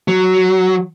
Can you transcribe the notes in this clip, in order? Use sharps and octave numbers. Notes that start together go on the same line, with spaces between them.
F#3